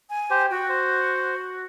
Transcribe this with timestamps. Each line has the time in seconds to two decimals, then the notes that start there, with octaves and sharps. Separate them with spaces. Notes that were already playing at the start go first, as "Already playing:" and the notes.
0.10 G#5
0.30 G4 C5
0.50 F#4 G5
0.69 C5